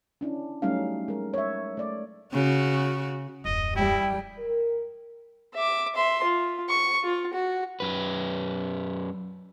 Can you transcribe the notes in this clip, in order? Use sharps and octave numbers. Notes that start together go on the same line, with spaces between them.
C#4 D4 E4
F#3 G3 A3 C#4 D#4 F5
G#3 A#4
C#5 E5
A3 D5
C#3 F#4
D#1 F#2 D#5
G3 E4 G5
A#4
E5 D6
E5 C6
F4
C#6
F4
F#4
F#2 B4